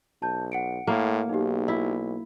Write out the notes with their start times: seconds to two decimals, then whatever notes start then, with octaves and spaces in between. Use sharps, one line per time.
0.22 B1 A5 G6
0.52 F#5 C#7 D7
0.87 A2 A#3
1.29 B1 D#4 G4
1.68 E4